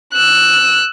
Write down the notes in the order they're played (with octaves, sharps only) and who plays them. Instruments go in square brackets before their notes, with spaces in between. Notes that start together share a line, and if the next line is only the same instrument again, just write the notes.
[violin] E6 F#6